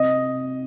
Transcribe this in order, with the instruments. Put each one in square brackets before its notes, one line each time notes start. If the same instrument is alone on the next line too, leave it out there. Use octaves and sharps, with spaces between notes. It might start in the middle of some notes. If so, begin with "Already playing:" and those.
Already playing: [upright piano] C3 D#5